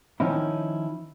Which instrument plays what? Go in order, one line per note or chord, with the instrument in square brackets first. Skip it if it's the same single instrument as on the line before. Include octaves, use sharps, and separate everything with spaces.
[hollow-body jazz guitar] D#3 F3 C#4 D#4 E4